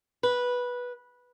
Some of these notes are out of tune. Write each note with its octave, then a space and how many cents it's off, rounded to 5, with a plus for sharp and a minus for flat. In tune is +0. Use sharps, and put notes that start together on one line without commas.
B4 -10